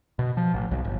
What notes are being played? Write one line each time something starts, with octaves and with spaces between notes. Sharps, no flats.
B2
F3
A1
B1
G1